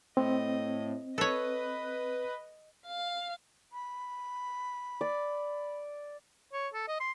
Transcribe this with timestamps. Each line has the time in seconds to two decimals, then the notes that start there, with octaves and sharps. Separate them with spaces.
0.17 A2 C4 D#5
1.18 A4 B4 C#5 D#5
2.88 F5
3.72 B5
5.01 D5
6.53 C#5
6.73 A4
6.88 D#5
7.00 C6